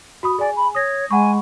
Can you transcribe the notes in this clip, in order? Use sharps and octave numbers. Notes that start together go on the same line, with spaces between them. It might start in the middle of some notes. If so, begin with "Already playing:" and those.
F#4 B5 D#6
G#4 D5 G#5
B5
C#5 D#6 A#6
G#3 F#5 G#5 B5 C#6